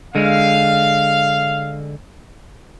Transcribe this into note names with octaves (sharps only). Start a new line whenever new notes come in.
D3 G#3 F5